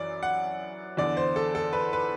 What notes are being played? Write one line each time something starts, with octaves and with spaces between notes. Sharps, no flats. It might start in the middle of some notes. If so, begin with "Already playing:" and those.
Already playing: F#2 E3 D5
F#5
E2 D3 D5
C5
A4
A4
B4
B4